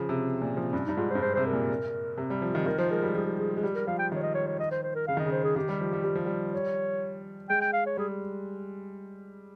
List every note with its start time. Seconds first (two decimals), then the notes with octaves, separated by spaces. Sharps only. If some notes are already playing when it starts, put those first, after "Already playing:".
Already playing: C#3 F3
0.09 C3
0.25 C4
0.41 A#2
0.57 F3
0.73 G2 C#4
0.85 D#4
0.89 G2
0.97 G#2 F4
1.10 C5
1.15 G2
1.21 G#2 C5
1.34 C3 C5
1.46 A#4
1.53 A#2
2.17 C3
2.30 G3
2.42 F3
2.55 D#3
2.66 D#3 A#4
2.78 F3 C5
2.91 G#3 A#4
3.02 G3
3.15 F3 G#4
3.26 G4
3.39 G#4
3.57 G#3
3.63 G3 G4
3.74 A#4
3.87 F3 F5
3.99 G5
4.12 D#3 C#5
4.23 D#5
4.35 C#5
4.47 C#5
4.59 D#5
4.71 C5
4.83 C5
4.95 A#4
5.07 C#3 F5
5.17 D#3 D#5
5.26 C#3
5.32 C5
5.44 G#4
5.56 D#3 G4
5.69 G3
5.81 F3
5.93 G3
6.04 G3
6.15 F3
6.26 G3
6.53 C#5
7.49 G#3 G5
7.61 G5
7.73 F5
7.86 C#5
7.97 G3 G#4